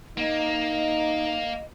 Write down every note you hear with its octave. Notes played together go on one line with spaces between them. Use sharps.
A#3 D#4 D#5